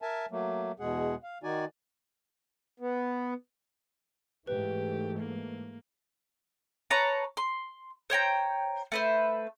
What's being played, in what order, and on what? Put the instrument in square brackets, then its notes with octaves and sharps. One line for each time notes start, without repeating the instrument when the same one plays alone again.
[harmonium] A#4 E5 G#5 A5
F#3 A3 A#3
E2 B2 G#3 G#4 F#5
F5
D#3 D#4 F#4 D5 G#5
B3
[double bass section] G#2 E3 A3 [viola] G4 [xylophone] B4
[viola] A#3
[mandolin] B4 C#5 A5 A#5
C6
C5 C#5 G5 A#5
A3 B4 C5